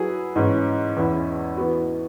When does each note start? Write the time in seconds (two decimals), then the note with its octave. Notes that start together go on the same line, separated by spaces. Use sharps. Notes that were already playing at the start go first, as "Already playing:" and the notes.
Already playing: F#3 E4 G#4 B4
0.36 G#2 E3 C#4
0.96 E2 E3 C#4 E4
1.57 E3 B3 F#4